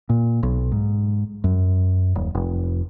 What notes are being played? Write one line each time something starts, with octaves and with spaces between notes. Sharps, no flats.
A#2
B1
G#2
F#2
D#1
F1